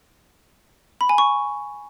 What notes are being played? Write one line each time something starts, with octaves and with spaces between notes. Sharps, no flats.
B5
G#5
C#6